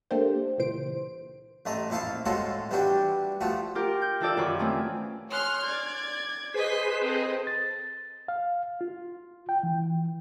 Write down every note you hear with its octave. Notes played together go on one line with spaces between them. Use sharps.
A3 A#3 D4 G4 C5
C#2 A#2 E3 C5 D7
A1 A3 D#5 A#5
A#1 E4 A4 F5 A5
A2 G#3 C#4 F4 F#4 A4
E3 G3 D4 F#4 G4
F3 A3 F#4
F4 G4 A#4
G6
E3 F4 A4 D5 E6
F#2 D#3 F4 B5 C#6
E3 A3 C4 C#4
G#4 C#5 C6 F6 F#6
D5 G#6
G#4 B4 C5 D#5 B6
C4 A4 D#5
A6
F5
F4
G5
E3